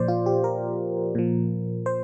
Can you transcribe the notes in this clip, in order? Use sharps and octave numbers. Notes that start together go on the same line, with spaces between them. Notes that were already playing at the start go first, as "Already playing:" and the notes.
Already playing: A#2 F3 C5 D5
F4
G4
A#4
A#2 F3
C5